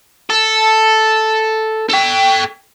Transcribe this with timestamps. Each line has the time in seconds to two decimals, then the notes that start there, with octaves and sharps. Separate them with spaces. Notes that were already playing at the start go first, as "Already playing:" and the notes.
0.30 A4
1.90 A4 G5